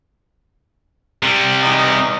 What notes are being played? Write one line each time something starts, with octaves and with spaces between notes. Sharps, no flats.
C3 G3
E2 D#4